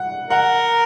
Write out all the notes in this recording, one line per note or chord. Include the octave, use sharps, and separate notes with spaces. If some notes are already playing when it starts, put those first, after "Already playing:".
Already playing: F#5
A#4 F#5